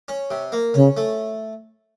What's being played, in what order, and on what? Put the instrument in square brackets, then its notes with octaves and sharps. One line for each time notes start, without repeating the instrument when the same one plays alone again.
[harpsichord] C#4
C3
A#3
[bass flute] C#3 [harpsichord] C#4
[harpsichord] A3